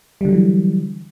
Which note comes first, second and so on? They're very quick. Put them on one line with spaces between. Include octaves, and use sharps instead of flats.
G3 D3 F#3 E3